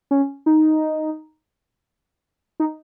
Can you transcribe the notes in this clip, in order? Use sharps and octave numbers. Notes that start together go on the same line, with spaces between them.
C#4
D#4
D#4